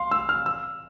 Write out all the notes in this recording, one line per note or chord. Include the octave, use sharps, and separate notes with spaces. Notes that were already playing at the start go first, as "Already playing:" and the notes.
Already playing: F5 C6
E6
F6
E6